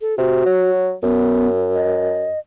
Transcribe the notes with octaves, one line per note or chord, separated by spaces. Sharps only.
A4
C3 F#4
F#3
F#2 B3
D#5